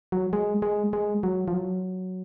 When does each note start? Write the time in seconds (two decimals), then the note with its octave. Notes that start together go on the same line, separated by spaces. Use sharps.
0.12 F#3
0.33 G#3
0.62 G#3
0.93 G#3
1.23 F#3
1.48 F3
1.54 F#3